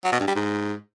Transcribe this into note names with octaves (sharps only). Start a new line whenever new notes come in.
F#3
B2
G2
G3
G#2